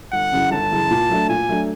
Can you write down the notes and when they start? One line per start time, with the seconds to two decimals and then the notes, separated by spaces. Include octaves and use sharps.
0.12 G1 F#5
0.32 F#2 C#3 E3
0.51 G1 A5
0.71 F#2 C#3 E3
0.90 A#2
1.10 F#3 A3 D4
1.29 A#2 G#5
1.49 F#3 A3 D4